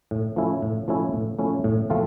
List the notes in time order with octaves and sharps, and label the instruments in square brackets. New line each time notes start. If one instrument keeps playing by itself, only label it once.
[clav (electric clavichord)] A2
F3 A3 C#4 E4
A2
F3 A3 C#4 E4
A2
F3 A3 C#4 E4
A2
F3 A3 C4 F4